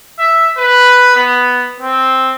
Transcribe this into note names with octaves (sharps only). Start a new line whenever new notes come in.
E5
B4
B3
C4